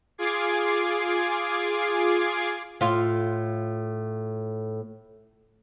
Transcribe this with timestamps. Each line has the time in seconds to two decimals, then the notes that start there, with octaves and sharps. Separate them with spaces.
0.18 F4 G#4 D6 G#6 C7
2.81 A2 F4